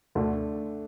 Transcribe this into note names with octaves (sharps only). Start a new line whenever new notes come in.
D2 D3 A3 D4